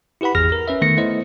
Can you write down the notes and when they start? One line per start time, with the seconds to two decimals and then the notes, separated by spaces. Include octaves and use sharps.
0.21 E4 G4 B4 F#5 B5
0.35 G#1 E2 G#4 F6 A#6
0.52 A#4
0.68 C#4 B4 E5
0.82 D#3 A3 B3 A#6 C#7
0.97 A3 B3 E4 C5 D#5